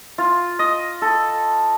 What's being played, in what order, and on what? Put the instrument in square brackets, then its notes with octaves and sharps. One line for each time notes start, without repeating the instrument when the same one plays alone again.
[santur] F4
D#5
A4